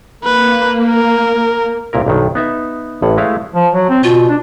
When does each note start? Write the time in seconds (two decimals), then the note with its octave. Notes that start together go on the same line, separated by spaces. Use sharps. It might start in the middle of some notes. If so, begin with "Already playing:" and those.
0.24 A#3 B4
0.88 A#4
1.93 C2 A#2 E4 A#4
2.06 B1 G2 D#3 F#3
2.35 B3 D#4 E5
3.02 A1 A2 F#5
3.17 G#3 A3 E4 B4 C#5 F5
3.54 F3
3.73 F#3
3.89 C4
4.04 B2 F4
4.29 D4